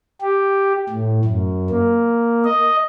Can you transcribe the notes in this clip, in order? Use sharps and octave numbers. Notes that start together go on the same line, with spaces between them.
G4
A2
F#2
A#3
D#5